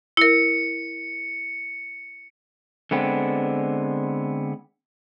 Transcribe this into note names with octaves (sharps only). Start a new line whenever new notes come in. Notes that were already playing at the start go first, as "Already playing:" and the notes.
E4 A#4 C#7
D3 G#3 B3 C4